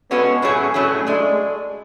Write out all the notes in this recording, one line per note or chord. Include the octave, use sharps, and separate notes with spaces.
B2 G#3 B3 C#4 F#4 A4
A2 F#3 A3 C#4 E4 G#4
A2 F#3 A3 C#4 E4 G#4
G#3 A3 D4 G#4